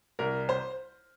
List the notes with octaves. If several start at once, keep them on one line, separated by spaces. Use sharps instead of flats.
C2 A#4
C5